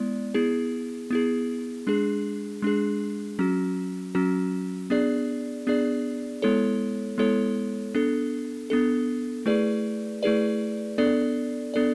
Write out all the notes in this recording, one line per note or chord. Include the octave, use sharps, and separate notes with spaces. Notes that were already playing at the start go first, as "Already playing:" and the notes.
Already playing: G#3 B3 E4 D5
B3 E4 G#4
B3 E4 G#4
G#3 D4 G#4
G#3 D4 G#4
F#3 C#4 F#4
F#3 C#4 F#4
B3 D4 G#4 D5
B3 D4 G#4 D5
G#3 B3 E4 A4 C#5
G#3 B3 E4 A4 C#5
B3 D4 A4
B3 D4 A4
A3 E4 G#4 B4 D5
A3 E4 G#4 B4 D5
B3 D4 A4 D5
B3 D4 A4 D5